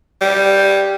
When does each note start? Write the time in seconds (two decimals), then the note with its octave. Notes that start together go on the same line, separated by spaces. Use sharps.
0.21 G3